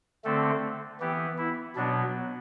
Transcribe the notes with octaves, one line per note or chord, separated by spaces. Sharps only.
D3 A3 C4 A4
E3 B3 G4
E4
B2 F#3 B3 D4